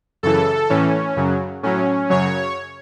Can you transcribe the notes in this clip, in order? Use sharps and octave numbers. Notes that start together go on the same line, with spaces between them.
F#2 C#3 E3 A4
A2 E3 C#4
F#2 C#3 F#3
A2 F#3 C#4
F#2 C#3 F#3 C#5